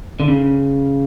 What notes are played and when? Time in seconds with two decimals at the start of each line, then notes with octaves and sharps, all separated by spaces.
0.20 D3
0.28 C#3